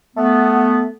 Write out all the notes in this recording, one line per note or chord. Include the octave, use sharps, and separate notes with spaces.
A3 B3